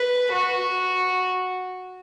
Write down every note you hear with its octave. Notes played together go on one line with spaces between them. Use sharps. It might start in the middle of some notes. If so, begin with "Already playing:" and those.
Already playing: B4
F#4